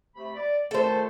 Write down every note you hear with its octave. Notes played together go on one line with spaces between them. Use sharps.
C3 A3 B5
D5
A#2 D#3 A3 A4 C5